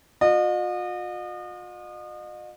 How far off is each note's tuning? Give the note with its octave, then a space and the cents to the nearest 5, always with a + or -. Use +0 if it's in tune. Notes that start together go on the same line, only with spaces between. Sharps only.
F4 +45 D#5 -35